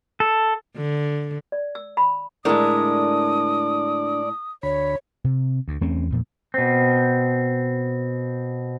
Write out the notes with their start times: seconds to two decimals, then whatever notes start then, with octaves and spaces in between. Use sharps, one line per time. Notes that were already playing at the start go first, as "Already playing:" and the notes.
0.20 A4
0.77 D3
1.52 D5
1.75 E6
1.97 B5
2.45 A2 D3 G#3 D4 A#4 D5 D#6
4.63 D2 C#5 B5
5.24 C3
5.68 D2
5.81 E2 A3 C4 C#4
6.10 E2 A#2 F3
6.54 B2 C4